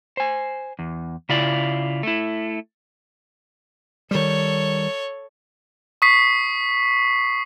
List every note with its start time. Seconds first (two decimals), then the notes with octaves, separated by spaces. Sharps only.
0.17 C5 G#5
0.79 E2
1.29 C#3 E4 F4 D5
2.03 A3 E4
4.11 D#3 G3 A4 C#5
6.02 C#6 D#6 B6 C7